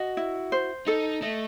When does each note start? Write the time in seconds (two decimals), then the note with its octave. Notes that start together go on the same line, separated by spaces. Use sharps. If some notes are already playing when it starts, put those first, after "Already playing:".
Already playing: F#4 D#5
0.17 E4
0.52 C5
0.87 D#4 A4
1.22 A3 D#5